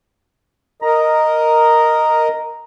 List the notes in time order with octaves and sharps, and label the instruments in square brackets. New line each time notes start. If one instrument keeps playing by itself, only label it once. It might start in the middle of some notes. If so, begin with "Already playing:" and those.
[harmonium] A#4 D#5 [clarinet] A#5